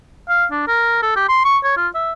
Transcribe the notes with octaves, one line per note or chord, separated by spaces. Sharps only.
F5
D4
A#4
A4
G4
C6
C#6
C#5
F4
E5